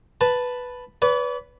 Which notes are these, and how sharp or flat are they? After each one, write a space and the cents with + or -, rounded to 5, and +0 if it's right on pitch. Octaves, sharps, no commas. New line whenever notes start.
B4 +0 A5 +0
B4 +0 D5 -45